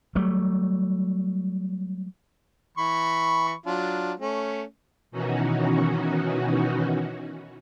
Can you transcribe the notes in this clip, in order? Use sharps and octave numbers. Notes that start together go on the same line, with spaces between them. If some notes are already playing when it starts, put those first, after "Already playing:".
F#3 G3 A3
E3 B5 C#6
F#3 D4 F4
A3 C#4
B2 D#3 E3 C#4 D#4 F#4